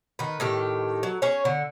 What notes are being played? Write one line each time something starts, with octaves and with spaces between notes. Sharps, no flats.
D#3 B4
A2 D#3 G4
F#3
C#4 G#4 C#5
D3